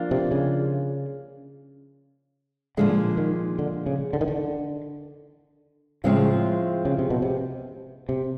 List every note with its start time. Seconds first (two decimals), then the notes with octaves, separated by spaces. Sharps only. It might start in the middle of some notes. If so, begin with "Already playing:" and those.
Already playing: F3 A#3 D4 F4
0.11 C3
0.31 C#3
2.77 A#2 D3 F3 G#3
3.17 D#3
3.59 D3
3.86 C#3
4.13 D3
4.21 D#3
4.28 D3
6.04 A2 C#3 F3 G#3 C4 F4
6.85 C#3
6.99 C3
7.10 B2
7.22 C3
8.09 C3